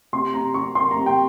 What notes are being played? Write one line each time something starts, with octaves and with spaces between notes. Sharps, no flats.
C3 C6
C3 A#5
C3 C#6
A#3 C6
A#5
C3
G5